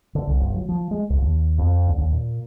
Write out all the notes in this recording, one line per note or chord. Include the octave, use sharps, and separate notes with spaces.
D3
C2
G1
F#3
F3
G#3
C#2
D#2
F2
D2
D#2
A#2